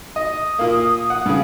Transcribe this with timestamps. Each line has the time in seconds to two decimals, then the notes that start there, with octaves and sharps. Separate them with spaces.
0.16 D#5 D#6
0.59 A#2 A#3
1.10 F#5
1.26 G2 C#3